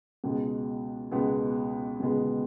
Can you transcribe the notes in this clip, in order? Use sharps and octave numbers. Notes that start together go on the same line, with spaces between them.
C#2 B2 G#3 B3
C#2 B2 G#3 B3
C#2 B2 G#3 B3